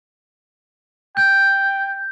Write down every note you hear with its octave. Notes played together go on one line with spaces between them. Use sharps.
G5 G6